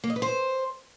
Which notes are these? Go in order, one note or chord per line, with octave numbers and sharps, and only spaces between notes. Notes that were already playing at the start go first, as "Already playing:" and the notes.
A#3
D#5
B4
C5